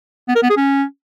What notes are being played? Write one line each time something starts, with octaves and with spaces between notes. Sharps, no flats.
B3
A#4
B3
G#4
C#4